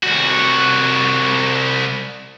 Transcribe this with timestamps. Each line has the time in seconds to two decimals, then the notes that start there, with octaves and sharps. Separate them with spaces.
0.04 C2 F#4